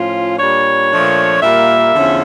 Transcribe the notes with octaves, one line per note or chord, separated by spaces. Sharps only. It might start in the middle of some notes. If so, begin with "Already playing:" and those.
Already playing: A2 F3 C#4 F4
A#2 G3 D4 C#5
A#2 F3 A3 D4
A#2 G3 A#3 E5
E2 D3 F3 C#4